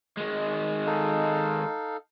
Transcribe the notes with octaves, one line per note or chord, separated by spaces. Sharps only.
D#3 G#3
D#4 A4 F5